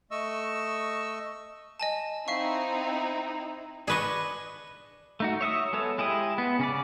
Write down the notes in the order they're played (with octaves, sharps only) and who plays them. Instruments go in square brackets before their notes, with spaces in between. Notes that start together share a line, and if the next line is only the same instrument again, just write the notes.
[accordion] A3 D#5 C#6 E6
[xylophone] D#5 G#5 A5
[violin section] C4 D#4 E4 [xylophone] E5 F5 C#6
[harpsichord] D4 C#6 [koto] G#4 B4 D#5
[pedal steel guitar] A3 D#4 F#4
C#5 E5 F5 D#6
G#3 B3 A4 C#5
G#3 E4 G4 D#6
B3
C#3 C#4 D5